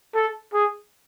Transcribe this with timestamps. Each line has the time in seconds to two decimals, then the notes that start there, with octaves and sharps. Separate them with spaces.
0.15 A4
0.53 G#4